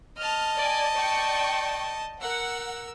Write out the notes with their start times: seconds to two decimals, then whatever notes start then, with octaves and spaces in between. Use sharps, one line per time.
0.18 D#5 A5 F6
0.57 D5 G#5
0.97 D5 G5 C#6
2.22 A#4 F#5 E6